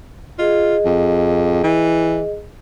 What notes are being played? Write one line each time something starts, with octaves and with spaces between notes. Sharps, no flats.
F4 G#4 D#5
F2
E3